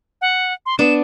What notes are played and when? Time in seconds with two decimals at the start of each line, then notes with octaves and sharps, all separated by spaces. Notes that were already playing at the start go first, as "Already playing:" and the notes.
0.21 F#5
0.66 C6
0.79 B3 D4 E7